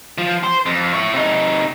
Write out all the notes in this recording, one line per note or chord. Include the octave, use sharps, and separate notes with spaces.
F3
C5
F2
E4 C#5
C3 D#4